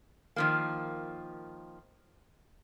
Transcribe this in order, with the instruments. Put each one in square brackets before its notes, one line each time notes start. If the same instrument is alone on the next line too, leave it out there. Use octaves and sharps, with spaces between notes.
[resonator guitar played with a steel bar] D#3 F3 A#3